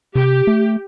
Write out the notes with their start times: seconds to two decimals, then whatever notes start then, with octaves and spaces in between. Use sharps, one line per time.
0.15 C3 G4
0.47 A3